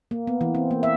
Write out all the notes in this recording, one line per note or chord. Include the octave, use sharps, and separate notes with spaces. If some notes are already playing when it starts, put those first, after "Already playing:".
A#3
B3
E3
C4
A#3
E5